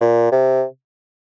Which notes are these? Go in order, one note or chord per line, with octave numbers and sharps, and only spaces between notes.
A#2
C3